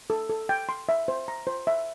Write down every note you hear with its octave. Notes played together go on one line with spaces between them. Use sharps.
A4
A4
G5
C6
E5
C5
A#5
C5
E5